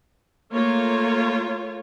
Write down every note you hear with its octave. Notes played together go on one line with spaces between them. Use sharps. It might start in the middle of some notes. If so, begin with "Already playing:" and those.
A3 A#3 F4 C#5